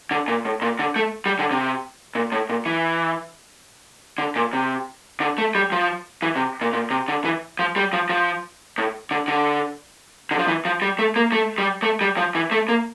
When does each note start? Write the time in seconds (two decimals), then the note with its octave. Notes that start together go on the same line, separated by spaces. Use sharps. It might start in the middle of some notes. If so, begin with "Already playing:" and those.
0.11 D3
0.28 A#2
0.45 A2
0.62 A#2
0.79 D3
0.96 A3
1.26 G3
1.39 D3
1.51 C3
2.15 A#2
2.32 A2
2.50 A#2
2.66 E3
4.18 D3
4.36 A#2
4.53 C3
5.21 D3
5.38 A3
5.55 G3
5.72 F3
6.22 E3
6.36 C3
6.61 A#2
6.73 A#2
6.90 C3
7.08 D3
7.25 E3
7.59 F3
7.76 G3
7.93 F3
8.09 F3
8.78 A2
9.11 D3
9.28 D3
10.31 D3
10.39 F3
10.48 E3
10.65 F3
10.82 G3
10.99 A3
11.16 A#3
11.32 A3
11.58 G3
11.83 A3
12.01 G3
12.17 F3
12.35 E3
12.51 A3
12.69 A#3